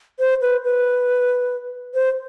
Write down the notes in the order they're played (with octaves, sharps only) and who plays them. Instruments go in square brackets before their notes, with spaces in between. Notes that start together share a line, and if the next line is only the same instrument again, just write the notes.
[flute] C5
B4
B4
C5